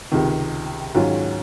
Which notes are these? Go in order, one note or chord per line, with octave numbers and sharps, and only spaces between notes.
C#2 C3 D#3
G#2 D#3 F#3 C#4 F4